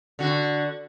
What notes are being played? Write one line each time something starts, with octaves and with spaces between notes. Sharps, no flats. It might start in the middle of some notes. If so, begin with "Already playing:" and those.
D3 F#4